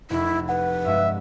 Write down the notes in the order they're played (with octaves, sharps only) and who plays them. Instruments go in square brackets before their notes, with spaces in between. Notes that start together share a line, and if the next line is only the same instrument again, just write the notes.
[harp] F1 [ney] E4
[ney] B4 [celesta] F#5
[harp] G2 G#3 [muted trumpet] E5